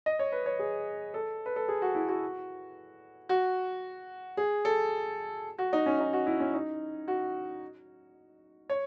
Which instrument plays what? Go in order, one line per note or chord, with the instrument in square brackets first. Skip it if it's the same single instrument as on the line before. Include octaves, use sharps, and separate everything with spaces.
[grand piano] D#5
C#5
B4
C#5
G#4
A4
B4
A4
G#4
F#4
E4
F#4
F#4
G#4
A4
F#4
D#4
C#4
D#4
F#4
E4
C#4
D#4
F#4
C#5